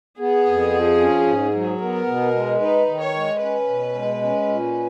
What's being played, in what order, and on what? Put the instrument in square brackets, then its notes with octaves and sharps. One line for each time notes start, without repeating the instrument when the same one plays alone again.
[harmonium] B3 [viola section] G#4
[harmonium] F2
F3
C#4
G#2
F#3
[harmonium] B3 [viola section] A#4
[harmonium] B2
G#3
[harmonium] D#4 [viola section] B4
[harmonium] D#3
[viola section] C#5
[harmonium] G#3
[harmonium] C#4 [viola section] B4
[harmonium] B2
G#3
C#4
A#2